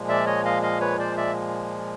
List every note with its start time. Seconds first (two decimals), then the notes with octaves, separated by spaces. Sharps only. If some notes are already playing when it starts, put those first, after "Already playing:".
Already playing: A#2 F3 G#3
0.08 D5 E5
0.26 C#5 D#5
0.45 D#5 F5
0.62 D#5 F5
0.80 B4 C#5
0.99 C5 D5
1.17 D5 E5